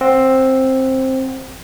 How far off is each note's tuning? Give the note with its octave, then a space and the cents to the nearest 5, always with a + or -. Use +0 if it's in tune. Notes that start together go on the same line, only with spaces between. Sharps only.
C4 +10 F#5 +0